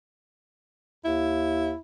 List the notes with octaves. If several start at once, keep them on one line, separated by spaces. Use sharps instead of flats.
D#2 E4